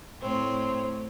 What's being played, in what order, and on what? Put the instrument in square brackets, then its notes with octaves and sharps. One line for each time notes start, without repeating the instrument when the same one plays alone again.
[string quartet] A2 C4 C#5